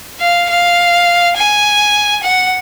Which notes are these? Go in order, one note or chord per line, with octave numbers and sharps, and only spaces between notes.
F5
F5
G#5
F#5